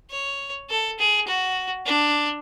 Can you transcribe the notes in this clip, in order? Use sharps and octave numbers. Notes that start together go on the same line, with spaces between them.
C#5
A4
G#4
F#4
D4